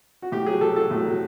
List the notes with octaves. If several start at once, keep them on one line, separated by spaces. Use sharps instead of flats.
F#4
A2 G4
F#3 G#4
F#3 A4
F#3 A4
A2
F#3